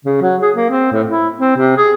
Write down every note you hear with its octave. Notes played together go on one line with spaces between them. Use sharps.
C#3
F#3
G#4
A#3
C4
A2
E4
C4
C3
G#4